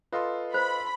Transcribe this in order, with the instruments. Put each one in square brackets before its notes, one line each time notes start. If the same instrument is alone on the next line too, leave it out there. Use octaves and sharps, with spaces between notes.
[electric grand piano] F4 A4 C6 [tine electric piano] B4 D#5 F5
[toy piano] C5 [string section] B5